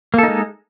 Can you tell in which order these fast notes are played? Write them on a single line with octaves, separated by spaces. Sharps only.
A#3 A4 D#4 G#3